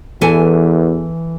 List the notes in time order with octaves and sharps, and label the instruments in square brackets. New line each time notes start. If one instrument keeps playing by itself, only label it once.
[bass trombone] E2 [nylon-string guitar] E3 A4 G#5